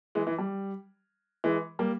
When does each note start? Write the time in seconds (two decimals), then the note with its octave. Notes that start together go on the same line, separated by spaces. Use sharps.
0.15 E3 G#3
0.27 E3
0.38 G3
1.44 E3 G#3
1.79 G3 A#3